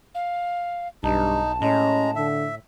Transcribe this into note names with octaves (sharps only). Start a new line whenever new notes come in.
F5
B1 G2 D#4 A5
A2 G#3 C#4 A#5
D3 E5